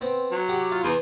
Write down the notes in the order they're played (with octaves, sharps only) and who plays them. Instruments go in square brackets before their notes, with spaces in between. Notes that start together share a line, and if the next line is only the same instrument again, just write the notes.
[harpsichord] B3 C4
[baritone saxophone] F#3
[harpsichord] G4 F#5
F4
[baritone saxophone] E2 [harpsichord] B3 C6